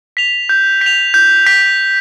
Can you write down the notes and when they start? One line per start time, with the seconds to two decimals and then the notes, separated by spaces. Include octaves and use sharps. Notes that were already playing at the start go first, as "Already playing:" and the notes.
0.17 B6 F7
0.49 G6
0.81 B6 F7
1.14 G6
1.47 B6